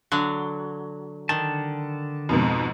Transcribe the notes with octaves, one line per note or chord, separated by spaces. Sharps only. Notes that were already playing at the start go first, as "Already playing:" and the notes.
D3 F#3
D3 D#3 A5
F2 G#2 B2